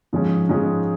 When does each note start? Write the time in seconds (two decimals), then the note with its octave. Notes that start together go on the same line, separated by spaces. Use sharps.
0.13 G#2 F3 G#3 C#4
0.49 G#2 F3 G#3 C#4